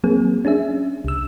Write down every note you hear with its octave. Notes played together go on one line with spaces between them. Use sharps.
F#3 A#3 C4 G#4
C#4 D4 G#4 E5
C2 E6